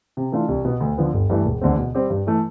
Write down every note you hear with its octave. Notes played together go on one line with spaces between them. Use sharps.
C3
E3 A3 D4 F4
C2
B2 B3
D2
D3 F3 B3
G1
G2 E3 A3
E1
E2 D3 A3 C4
B2
G3 C4 G4
G2
E3 A3